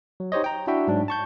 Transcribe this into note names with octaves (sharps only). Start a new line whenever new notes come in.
F#3
D#4 G4 C5 C#5 D#5
G5 A#5
D4 E4 F#4 E5 G5
G#2 F#3 D4
A5 C#6 G6